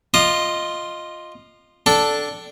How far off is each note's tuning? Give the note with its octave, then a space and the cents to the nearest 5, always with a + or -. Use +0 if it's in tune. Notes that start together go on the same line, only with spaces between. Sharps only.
F4 +0 D#5 +0 D#6 -40
D4 +0 A4 +0 G5 -30